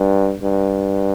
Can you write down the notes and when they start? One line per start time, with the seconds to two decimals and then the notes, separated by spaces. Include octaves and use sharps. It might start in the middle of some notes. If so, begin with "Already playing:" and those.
Already playing: G2
0.43 G2